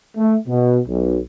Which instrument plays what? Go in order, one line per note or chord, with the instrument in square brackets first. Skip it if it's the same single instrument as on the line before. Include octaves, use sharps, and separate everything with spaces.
[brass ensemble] A3
B2
B1